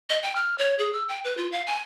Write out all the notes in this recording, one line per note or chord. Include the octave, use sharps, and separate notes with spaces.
D#5
G5
F6
C#5
G#4
E6
G5
B4
F4
F5
G#5